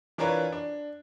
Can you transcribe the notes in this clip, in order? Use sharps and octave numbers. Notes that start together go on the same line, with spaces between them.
E3 D4 F4 A#4 B4 C#5
D4